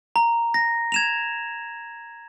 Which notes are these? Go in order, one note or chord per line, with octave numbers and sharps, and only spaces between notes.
A#5
A#6
G#6 E7 F7